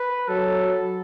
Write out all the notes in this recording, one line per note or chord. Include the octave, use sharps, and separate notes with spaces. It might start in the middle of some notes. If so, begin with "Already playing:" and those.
Already playing: B4
F#3 A4